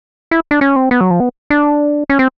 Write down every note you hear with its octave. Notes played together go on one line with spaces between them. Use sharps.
E4
D4
C#4
C4
B3
F#3
F3
B3
D4
C#4
C4